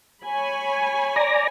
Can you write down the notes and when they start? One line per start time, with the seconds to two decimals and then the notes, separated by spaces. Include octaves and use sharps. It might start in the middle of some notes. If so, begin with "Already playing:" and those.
0.24 C#5 G#5 B5
1.16 D5 A#5